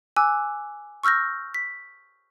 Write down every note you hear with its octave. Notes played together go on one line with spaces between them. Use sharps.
G#5 D6 E6 F#6
C#6 E6 F6 G6 A#6
B6